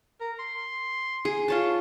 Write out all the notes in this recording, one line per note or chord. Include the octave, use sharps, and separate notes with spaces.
A#4
C6
G#4
F4 C#5 A5